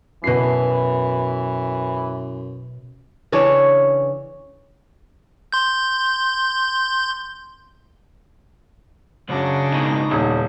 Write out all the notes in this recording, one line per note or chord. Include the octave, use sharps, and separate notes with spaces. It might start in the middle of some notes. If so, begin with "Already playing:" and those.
F#2 B2 E3 C7
C#3 E3 D4 C#5
C6 G6
C2 F#2 C#3 F#3 D4 A#6
G#2 B2 D#4
D#1 E2